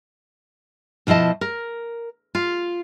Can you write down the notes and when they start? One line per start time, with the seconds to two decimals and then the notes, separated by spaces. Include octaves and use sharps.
1.07 B2 F3 E4 D#5 A5
1.41 A#4
2.35 F4